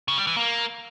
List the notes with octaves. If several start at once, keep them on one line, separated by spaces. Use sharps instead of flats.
C#3
G3
E3
A#3